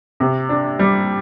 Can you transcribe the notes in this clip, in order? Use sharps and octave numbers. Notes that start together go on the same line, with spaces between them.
C3
D4
G3